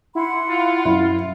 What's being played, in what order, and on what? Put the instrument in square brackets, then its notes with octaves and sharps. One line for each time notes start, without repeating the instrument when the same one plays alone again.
[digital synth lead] E4 [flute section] F#5 B5 C6
[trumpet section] F4
[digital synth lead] F#2 [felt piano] E4